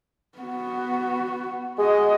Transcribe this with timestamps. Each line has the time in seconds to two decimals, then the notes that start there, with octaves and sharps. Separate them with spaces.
0.38 B3 F#4
1.78 G#3 F#4 D#5